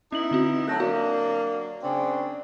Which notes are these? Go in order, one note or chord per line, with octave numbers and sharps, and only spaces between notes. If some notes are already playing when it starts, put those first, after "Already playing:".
B3 C#4 D#4 E4 F#7
D3 C4 F#4
F#3 A3 A4 F#6 G6 A#6
F#3 A#3 D4 F#4
C#3 C4 D4